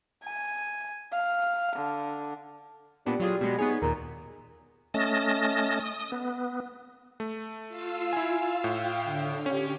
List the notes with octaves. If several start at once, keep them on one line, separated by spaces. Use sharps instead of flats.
G#5
F5
D3
A#2 G3 B3 D4
F#3 F4 G#4
B2 G#3 B3
B3 D#4 G#4 C#5
D#2 A#2 A#4
A3 C#4 D#5 A5 A#6
D#6
B3
A3
F4 F5 E6
E4 G#5
A2 F5 G5
D3
C#4 G4